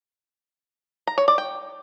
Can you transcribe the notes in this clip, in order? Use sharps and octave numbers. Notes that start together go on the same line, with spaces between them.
A#5
C#5
D5
G5